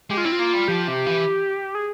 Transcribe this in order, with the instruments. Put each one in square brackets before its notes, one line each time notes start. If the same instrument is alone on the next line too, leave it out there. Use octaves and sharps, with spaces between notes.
[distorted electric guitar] G#3 [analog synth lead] G4
[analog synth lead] F4
[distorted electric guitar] C4 [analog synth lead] E4
[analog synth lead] F4
[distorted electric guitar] A#3
G3
[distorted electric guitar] F3 [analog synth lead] G4
[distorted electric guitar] C3
E3
[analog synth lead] G#4